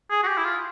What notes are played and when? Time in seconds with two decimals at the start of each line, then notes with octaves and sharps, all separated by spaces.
0.11 G#4
0.24 F#4
0.28 G4
0.38 E4
0.45 F4